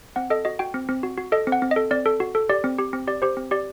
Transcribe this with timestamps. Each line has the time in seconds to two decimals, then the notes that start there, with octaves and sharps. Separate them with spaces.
0.16 C4 F#5
0.30 A4 D#5
0.45 F#4 D#5
0.59 F#4 G5
0.74 C4
0.89 C4
1.03 F#4
1.17 F#4
1.32 A4 D#5
1.47 C4
1.52 F#5
1.62 C4
1.71 D#5
1.76 A4
1.91 C4 D5
2.06 A4
2.20 F#4
2.35 A4
2.49 G4 D5
2.64 C4
2.79 G4
2.93 C4
3.07 G4 D5
3.22 G4 C5
3.37 C4
3.51 G4 D5